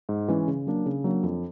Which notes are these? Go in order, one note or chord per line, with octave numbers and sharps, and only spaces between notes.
G#2
E3 G#3 C#4 E4
C#3
F#3 A#3 D4
C#3
F#3 A#3 D4
F2